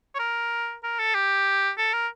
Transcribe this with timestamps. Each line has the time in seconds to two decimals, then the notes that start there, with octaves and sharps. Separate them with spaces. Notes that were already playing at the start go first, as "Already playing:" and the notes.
0.15 C#5
0.19 A#4
0.83 A#4
0.99 A4
1.14 G4
1.78 A4
1.93 A#4